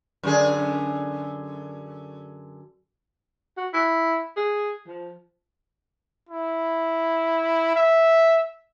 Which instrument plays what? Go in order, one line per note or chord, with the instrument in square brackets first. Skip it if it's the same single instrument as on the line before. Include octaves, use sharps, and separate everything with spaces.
[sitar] F#2 D3 G#4
[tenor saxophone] F#4
E4
G#4
F3
[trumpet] E4
E5